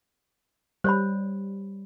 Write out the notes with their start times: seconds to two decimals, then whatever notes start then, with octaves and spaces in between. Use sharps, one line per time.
0.84 G3 C5 C#5 B5